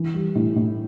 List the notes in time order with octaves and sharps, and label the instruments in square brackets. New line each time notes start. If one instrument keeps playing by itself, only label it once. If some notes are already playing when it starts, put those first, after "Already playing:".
Already playing: [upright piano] E3
G3
A2
A2